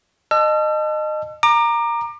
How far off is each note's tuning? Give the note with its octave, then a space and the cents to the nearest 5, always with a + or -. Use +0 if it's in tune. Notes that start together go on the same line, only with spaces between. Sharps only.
D#5 -20 A5 -10 E6 +40
A#5 +0 D6 +30